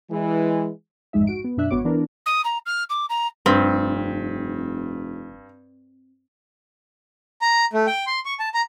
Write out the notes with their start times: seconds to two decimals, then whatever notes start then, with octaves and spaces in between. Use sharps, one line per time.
0.11 E3 G#3
1.13 A1 F2 G#2 G#3 D#4 E5
1.27 F#4 D7
1.44 B3
1.57 F#2 B2 D4 E5 F#6
1.71 G#1 B3 F#4 C#5 D6
1.85 E3 B3 D4 A#4
2.26 D#6
2.45 A#5
2.66 F6
2.90 D6
3.10 A#5
3.46 F1 G2 C4
7.41 A#5
7.73 A3
7.87 G5
8.07 C6
8.25 C#6
8.40 A5
8.54 A#5